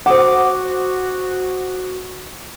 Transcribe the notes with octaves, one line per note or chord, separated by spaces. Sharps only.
F#4 C5 F#5 D6 D#6